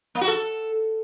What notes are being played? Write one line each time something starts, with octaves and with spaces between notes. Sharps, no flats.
A#3
F#4
A4